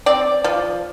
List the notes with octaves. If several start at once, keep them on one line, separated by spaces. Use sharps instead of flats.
C4 D5
F3